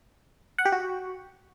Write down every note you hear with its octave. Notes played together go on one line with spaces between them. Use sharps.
F#5
G4
F#4